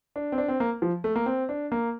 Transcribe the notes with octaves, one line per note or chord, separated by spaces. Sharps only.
D4
C4
D4
C4
A#3
F3
A3
A#3
C4
D4
A#3